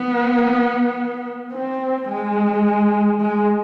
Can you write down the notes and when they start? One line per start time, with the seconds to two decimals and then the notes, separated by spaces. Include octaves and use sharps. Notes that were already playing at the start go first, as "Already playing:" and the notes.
Already playing: B3
1.52 C4
2.09 G#3
3.21 G#3